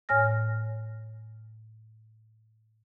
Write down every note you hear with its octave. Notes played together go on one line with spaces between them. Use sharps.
A2 C#5 G#5 F6 A#6